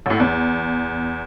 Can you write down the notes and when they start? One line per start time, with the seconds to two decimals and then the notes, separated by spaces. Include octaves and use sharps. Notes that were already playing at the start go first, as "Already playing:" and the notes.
0.06 A1 A2
0.20 E2